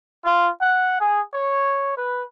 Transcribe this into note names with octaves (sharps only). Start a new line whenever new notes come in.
F4
F#5
G#4
C#5
B4